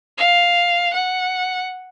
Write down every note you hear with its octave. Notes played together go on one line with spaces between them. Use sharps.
F5
F#5